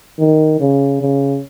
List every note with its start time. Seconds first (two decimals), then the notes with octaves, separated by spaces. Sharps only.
0.19 D#3
0.60 C#3
1.01 C#3